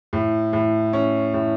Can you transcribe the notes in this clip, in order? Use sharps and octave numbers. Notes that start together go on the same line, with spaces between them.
A2
A2
C#4
A2